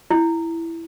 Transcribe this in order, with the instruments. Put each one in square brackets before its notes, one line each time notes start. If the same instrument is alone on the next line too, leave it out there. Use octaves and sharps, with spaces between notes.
[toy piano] E4